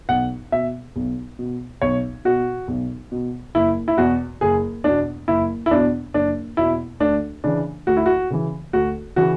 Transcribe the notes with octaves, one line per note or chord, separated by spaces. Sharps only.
B1 F#5
B2 E5
B1
B2
B1 C#5
B2 F#4
B1
B2
F#1 E4
E4
E2 B2 F#4
F#1 G#4
E2 B2 D4
F#1 E4
E4
E2 B2 D4
F#1 D4
E2 B2 E4
D2 D4
C#3 E3 D4
D2 F#4
E4
F#4
C#3 E3
D2 F#4
C#3 E3 F#4